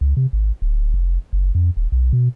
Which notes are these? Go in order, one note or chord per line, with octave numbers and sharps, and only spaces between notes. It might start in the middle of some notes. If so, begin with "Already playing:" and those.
C#2
C3
G#1
D1
F1
F#1
F2
D#1
B1
B2